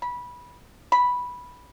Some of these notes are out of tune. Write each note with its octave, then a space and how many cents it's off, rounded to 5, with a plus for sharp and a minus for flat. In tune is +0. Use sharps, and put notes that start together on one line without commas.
B5 -15
B5 -5